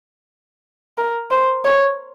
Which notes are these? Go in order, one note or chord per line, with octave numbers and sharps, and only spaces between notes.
A#4
C5
C#5